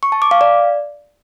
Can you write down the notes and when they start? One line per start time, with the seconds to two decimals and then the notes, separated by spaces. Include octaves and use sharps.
0.03 C#6
0.12 A5
0.22 D6
0.31 F5
0.41 D5